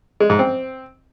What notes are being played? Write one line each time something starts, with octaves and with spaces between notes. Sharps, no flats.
G#3
G#2
C4